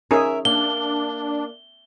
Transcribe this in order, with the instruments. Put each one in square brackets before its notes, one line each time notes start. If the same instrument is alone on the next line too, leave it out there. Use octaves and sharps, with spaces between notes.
[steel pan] C#4 D#4 G#4 [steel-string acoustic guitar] A#4 E5
[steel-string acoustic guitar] A#3 [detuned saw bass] D4 [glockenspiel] G7